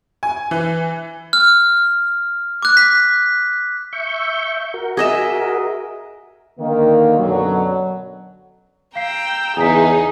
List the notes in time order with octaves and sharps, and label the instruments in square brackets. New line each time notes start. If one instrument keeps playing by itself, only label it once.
[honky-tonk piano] G#5
E3
[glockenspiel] F6
D6 F#6
B6
[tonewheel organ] E5 C#6 G6
F#4 A#4
[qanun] G#4 D#5 E5
[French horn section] D3 D#3 A#3
F#2 B2 D3 F#3
[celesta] F5 C7 [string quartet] G5 A#5 E6
[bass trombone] E2 [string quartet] C#3 D#4 [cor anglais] G#4 [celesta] A#5 B6